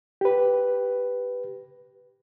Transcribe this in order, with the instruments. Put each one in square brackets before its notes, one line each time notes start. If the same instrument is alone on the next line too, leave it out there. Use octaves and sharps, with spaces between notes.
[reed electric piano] G4 B4